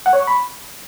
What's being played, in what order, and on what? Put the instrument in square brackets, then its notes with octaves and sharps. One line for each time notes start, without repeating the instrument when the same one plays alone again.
[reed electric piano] F#5
C#5
C#6
B5